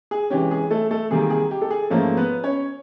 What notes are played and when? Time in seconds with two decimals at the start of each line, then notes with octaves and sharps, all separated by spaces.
0.11 G#4
0.30 C3 E3 G#3 C#4 G4
0.51 G#4
0.71 A3 A4
0.91 A3 A4
1.11 C3 D#3 G3 A#3 G#4
1.30 G#4
1.51 G4
1.62 A4
1.70 G#4
1.90 G#2 F3 A3 A#3 C#4 A4
2.17 B3 B4
2.44 C#4 C#5